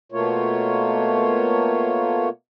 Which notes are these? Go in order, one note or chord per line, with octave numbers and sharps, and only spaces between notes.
B2 A3 A#3 F4 C#5